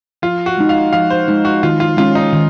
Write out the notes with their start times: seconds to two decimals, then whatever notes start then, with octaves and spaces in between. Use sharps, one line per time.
0.22 F3 F4
0.46 F#4
0.57 G#3 D#4
0.69 F5
0.93 F3 F5
1.10 C5
1.28 G#3 D#4
1.45 F#4
1.63 D#3 F4
1.80 F4
1.97 G#3 C#4 F4
2.15 D#4
2.33 D#3